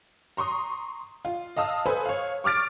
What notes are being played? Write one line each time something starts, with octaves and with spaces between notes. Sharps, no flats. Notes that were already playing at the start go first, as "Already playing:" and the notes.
A#5 C6 C#6 D#6
F4
D#5 F5 A5 D#6 E6
A4 B4 C5 G#5
C#5 F5
C#6 D6 F6 A6 D7